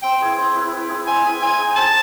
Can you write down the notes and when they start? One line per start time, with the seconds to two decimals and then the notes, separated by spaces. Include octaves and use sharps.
0.03 C4 G5
0.21 E4 G#4 B4
0.37 C4
0.55 E4 G#4 B4
0.72 C4
0.89 E4 G#4 B4
1.07 C4 G#5
1.24 E4 G#4 B4
1.42 C4 G#5
1.59 D#4 G#4
1.76 C4 A5